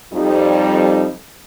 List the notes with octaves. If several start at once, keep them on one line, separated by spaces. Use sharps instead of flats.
F2 G3 D#4